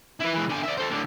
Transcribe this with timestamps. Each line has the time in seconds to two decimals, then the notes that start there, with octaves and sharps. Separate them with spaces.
0.21 E4 B4
0.33 E3 G#3
0.49 D3 G#5
0.63 D5 E5
0.77 A4 C5
0.91 A2 D3